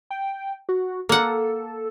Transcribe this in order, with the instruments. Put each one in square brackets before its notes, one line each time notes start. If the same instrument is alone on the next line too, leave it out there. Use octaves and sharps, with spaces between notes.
[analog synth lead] G5
F#4
[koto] A#3 F#5 [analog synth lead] A4